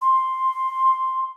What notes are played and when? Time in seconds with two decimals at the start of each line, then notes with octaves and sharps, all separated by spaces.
0.02 C6